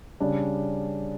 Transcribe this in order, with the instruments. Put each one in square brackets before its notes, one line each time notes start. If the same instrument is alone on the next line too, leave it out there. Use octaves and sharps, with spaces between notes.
[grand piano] C#3 G3 D4